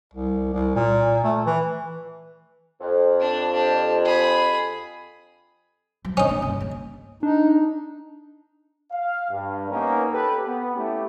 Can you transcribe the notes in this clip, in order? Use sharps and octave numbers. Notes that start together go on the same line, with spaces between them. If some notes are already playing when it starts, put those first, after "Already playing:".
C2
C2
A#2
A3
E3
F2
D4
D4 G4
G#4 B5
F#3
C3 D#3 C#4 D#4
A#3 D4
G2 C#3
A#3
D4 D#4
F5
G2
A#3 B3 C#4 D#4 A#4
G4 A4 B4
B3
A3 C#4 E4 G4